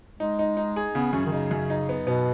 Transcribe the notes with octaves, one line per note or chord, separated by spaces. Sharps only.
G#3 D#4
D#4
D#4
G#4
C#3 B3
F#2 C#4
D#3
C#3 D#4
F#2
D#4
B3
B2 B3